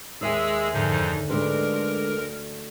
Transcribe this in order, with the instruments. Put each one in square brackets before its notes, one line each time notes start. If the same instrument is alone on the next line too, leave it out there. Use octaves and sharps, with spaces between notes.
[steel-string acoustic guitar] D#2 E5 G#5 [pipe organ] G#3 G#4 E6
[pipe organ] F2 F3 D#4 [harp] G#2 D3
[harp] D2 C6 [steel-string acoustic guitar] D3 G#3 B4 [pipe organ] A#4